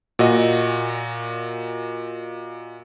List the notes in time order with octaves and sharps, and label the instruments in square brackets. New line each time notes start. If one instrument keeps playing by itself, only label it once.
[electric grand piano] A#2 F#4 D#5